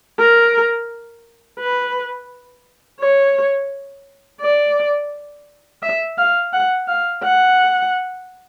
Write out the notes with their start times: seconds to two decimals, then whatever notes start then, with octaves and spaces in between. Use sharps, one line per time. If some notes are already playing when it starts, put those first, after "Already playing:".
0.19 A#4
1.60 B4
3.01 C#5
4.41 D5
5.83 E5
6.18 F5
6.53 F#5
6.88 F5
7.23 F#5